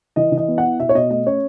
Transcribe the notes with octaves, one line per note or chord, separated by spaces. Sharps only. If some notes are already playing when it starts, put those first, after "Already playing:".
E3 D#5
E3
D#5
B3
F#5
E4
B2 E5
C#5
B2 D#5
A3 D#5
C#4 C#5